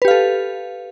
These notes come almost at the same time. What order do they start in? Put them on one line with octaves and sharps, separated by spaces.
B4 G4 F5 A4